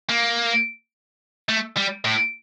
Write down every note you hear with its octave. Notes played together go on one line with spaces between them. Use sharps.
A#3
A3
G3
A2